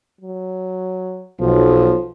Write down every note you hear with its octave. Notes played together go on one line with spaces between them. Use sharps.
F#3
B1 F3